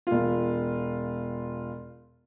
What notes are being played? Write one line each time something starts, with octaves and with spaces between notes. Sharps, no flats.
E1 F4